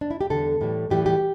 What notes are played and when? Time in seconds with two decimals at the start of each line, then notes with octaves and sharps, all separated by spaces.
0.01 D4
0.11 E4
0.21 G4
0.30 E2 D3 G3 A4
0.61 A2 E3 G3
0.90 A2 E3 G3 G4
1.06 G4